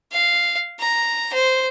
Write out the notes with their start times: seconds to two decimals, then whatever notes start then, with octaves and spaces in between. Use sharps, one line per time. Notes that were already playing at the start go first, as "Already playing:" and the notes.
0.13 F5
0.80 A#5
1.34 C5